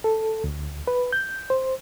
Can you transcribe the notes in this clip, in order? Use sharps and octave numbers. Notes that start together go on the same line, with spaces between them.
A4
D2
B4
G6
C5